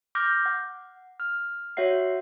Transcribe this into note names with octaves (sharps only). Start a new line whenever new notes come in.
D6 F6 G6 A#6
F#5
F6
F#4 C#5 E5 F#5 C7